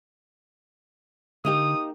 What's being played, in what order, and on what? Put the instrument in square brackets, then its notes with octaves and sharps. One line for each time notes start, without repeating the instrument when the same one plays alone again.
[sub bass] D3 [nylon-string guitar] A#3 D#4 G4 [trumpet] D#6